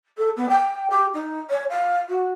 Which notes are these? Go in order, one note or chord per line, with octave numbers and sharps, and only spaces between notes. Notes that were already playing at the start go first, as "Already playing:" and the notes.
A4
B3
G5
G4
D#4
C#5
F5
F#4